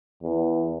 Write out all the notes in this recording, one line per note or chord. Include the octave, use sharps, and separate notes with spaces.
E2